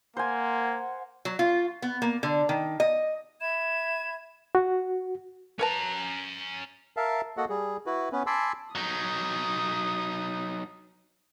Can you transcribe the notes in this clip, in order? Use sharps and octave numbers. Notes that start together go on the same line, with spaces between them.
A#3 C5 F#5 G#5
F#3
F4
B3
A#3
D3
D#3
D#5
E5 B5 G#6 E7
F#4
C#4 A#4 B4 A5 A#5
A#4 E5 F5 A5
A#3 F#4 A4 D#5 F#5
G3 G#4
E4 F#4 B4
B3 C#4 B4
G#5 A5 B5 C6 D6 E6
F#3 D#4 D#6